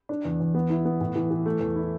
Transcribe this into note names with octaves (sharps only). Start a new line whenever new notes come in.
D4
E2
E2
B3
E4
B3
A2
E3
E3
A3
E2
E4